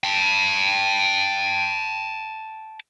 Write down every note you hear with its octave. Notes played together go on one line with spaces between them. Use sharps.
G5 A5